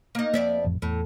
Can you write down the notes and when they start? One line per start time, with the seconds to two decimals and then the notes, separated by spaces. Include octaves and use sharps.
0.15 A#3 D#4
0.34 F2 A#3 D5 E5
0.64 A1 F2
0.82 E2 A2 A3